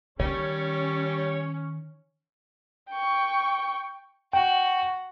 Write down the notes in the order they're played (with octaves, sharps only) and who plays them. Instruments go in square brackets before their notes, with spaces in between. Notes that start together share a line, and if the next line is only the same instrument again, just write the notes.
[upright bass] D#3 [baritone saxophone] G3 [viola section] C#4 [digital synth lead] C#5
[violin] G5 C#6
[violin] F#4 [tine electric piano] G5